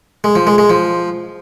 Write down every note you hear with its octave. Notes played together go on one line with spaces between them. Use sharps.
G#3
F3
G#3
G#3
F3